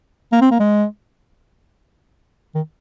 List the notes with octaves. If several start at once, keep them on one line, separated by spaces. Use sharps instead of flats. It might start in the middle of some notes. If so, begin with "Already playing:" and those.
A#3
C4
A#3
G#3
D#3